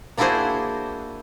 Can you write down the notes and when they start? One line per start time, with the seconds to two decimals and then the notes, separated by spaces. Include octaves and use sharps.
0.18 A#3 D4 E4 F#4 G#4 C5